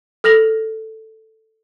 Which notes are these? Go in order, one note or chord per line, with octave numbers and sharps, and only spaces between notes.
A4 F6 A#6 F7 F#7